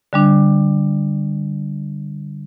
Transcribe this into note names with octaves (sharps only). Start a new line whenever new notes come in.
D3 G3 D4